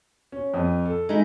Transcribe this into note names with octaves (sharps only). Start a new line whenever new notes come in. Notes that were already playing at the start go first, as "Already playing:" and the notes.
C#4
F2
A4
G#3 D#4 E4